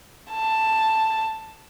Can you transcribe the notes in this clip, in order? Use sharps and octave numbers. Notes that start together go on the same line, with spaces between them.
A5